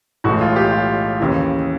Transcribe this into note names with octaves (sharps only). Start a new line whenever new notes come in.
B1 A2 E3 G#3 F#4
F4
G4
F4
D#2 C#3 E3